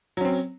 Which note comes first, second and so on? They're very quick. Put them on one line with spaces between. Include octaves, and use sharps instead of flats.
F#3 C#4 C4